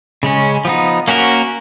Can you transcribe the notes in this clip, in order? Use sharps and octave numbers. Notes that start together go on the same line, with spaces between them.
C#3 G#3 C#4
F3 B3 D#4
A#3 C#4 F#4 A#4